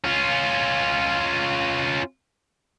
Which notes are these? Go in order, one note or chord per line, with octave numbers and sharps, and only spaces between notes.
C#4 F4